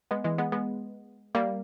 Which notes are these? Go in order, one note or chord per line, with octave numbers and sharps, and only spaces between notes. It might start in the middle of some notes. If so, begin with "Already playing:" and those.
G#3 B3
E3 G#3
G#3 B3
G#3 B3
G3 A#3